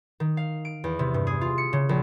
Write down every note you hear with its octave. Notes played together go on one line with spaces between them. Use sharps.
D#3
F5
D7
E2
C3
G2
G#4
F4
C#7
C#3
A#1